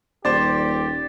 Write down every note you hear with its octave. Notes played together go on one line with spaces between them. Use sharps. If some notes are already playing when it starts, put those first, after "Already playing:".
D#1 G4 C5 D5 A6